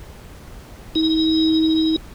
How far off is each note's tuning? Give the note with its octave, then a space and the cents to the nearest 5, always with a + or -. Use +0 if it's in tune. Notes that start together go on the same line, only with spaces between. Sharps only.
D#4 +40